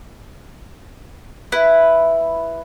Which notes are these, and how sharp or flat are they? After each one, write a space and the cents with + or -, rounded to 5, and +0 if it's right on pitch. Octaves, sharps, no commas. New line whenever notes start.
E4 +0 B4 +0